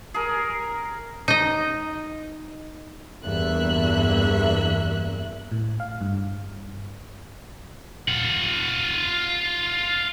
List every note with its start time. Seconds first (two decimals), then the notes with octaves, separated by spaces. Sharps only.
0.14 G#4 A#4
1.28 D#4 D#5
3.23 E2 G2 A#3 E5 F#6
5.52 A2
5.80 F5
6.01 G2
8.09 F4 F#5